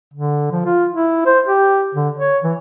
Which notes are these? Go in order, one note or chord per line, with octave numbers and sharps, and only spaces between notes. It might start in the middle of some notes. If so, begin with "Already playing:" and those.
D3
F3
F4
E4
C5
G4
D3
C#5
E3